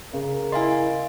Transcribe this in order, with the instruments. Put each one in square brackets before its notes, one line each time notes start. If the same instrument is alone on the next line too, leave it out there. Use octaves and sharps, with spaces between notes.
[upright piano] C#3 [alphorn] A#4
[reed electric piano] E4 C6 [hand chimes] D#5 F5 G#5